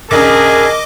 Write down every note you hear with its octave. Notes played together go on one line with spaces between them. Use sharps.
A#1 D#2 C#3 G#4 A#4 D#5 D6